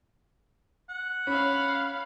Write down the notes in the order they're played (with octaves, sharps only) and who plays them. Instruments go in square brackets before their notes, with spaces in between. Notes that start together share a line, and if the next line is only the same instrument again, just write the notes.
[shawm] F#5
[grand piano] C#4 [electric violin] F5 B5